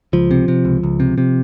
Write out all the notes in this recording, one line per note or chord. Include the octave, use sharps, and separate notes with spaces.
C#2 F3
C3
C3
C#2
C#2
C3
C3